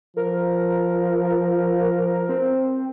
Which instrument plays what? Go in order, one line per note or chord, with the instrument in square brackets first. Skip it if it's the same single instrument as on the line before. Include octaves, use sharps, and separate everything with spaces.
[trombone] F3 [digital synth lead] A#4
[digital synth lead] C4